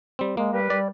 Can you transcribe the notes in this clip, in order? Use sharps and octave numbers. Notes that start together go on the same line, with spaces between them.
G3 C4
G#3 A#3
G3 G4 A#4 B4
G3 D5